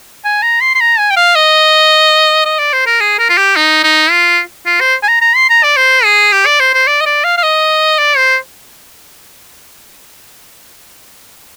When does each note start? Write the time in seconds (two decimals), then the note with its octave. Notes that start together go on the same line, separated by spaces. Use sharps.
0.25 G#5
0.43 A#5
0.61 C6
0.75 C6
0.80 A#5
0.99 G#5
1.11 G5
1.17 F5
1.35 D#5
2.45 D#5
2.59 D5
2.73 C5
2.87 A#4
3.00 G#4
3.19 A#4
3.30 F4
3.38 G4
3.56 D#4
3.84 D#4
4.11 F4
4.66 F4
4.80 C5
5.03 G#5
5.09 A#5
5.21 A#5
5.36 C6
5.50 A#5
5.64 D5
5.77 C5
6.04 G#4
6.33 G4
6.46 D5
6.60 C5
6.74 C5
6.87 D5
7.01 D#5
7.06 D5
7.24 F5
7.38 F5
7.43 D#5
7.98 D5
8.17 C5